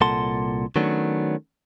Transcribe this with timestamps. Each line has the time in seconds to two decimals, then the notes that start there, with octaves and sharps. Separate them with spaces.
0.01 C2 A#2 A4 F#5 A5 C6
0.76 D#3 F#3 A3 B3 C#4 D4